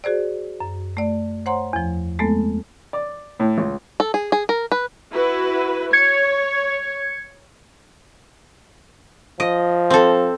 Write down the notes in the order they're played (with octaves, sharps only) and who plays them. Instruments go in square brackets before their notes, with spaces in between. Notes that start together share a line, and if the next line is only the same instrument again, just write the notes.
[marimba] F#4 G#4 C5 D5
F#2
A3 D5
C5 C#5 F#5 A#5 C6
E2 F3
G#3 A3 B3 C4 A4
[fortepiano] D5
A2
C#2
[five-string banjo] A4
G#4
G#4
A#4
B4
[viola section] E4 F#4 B4
[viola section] C#5 [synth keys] G#6 C#7
[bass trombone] F3 [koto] D#5
[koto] C4 A4